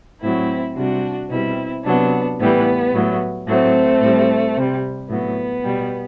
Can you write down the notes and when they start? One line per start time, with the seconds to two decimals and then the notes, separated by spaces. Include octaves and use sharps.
0.22 A2 F#3 C4 E4
0.76 C3 G3 D4 F#4
1.30 B2 G3 C4 E4
1.85 C3 F#3 B3 D4
2.39 A2 E3 G3 B3
2.93 A2 F#3
3.47 A2 F#3 A3 C4
4.01 A2 G3
4.55 C3
4.61 G3
5.09 A2 F#3 B3
5.65 B2 G3